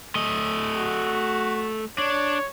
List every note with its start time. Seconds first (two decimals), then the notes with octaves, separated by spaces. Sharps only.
0.15 A3 D#5
0.75 F#4
1.98 D4 C#5